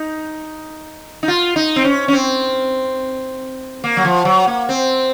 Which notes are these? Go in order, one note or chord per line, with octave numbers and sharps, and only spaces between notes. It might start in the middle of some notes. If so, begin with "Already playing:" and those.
Already playing: D#4
D#4
F4
D#4
C4
C#4
C#4
C4
A#3
F#3
F3
F#3
A#3
C4